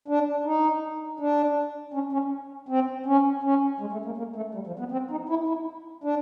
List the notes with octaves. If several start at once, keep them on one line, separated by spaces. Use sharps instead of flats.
D4
D#4
D4
C#4
C#4
C4
C#4
C#4
G#3
A3
A#3
A#3
A3
G3
F3
B3
C4
D#4
E4
E4
D4